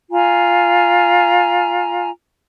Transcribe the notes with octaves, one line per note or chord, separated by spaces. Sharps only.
F4 G#5 A#5